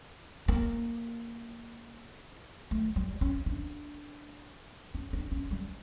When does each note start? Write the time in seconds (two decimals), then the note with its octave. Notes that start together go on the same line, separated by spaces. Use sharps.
0.48 A#3
2.71 A3
2.96 G3
3.21 C#4
3.46 D4
4.95 C#4
5.13 D4
5.32 C#4
5.51 G3